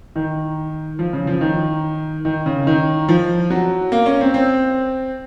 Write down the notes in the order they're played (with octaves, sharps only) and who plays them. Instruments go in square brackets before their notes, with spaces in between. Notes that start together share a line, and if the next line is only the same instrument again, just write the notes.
[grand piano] D#3
F3
C#3
F3
D#3
D#3
C#3
D#3
F3
F#3
A#3
C#4
C4
C4